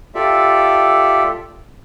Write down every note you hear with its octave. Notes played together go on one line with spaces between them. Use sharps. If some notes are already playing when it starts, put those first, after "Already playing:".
F4 G4 A4 D5 E5